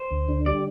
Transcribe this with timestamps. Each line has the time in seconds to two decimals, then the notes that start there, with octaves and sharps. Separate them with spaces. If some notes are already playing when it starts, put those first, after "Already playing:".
Already playing: C5
0.11 D2
0.28 D3
0.46 G3 D5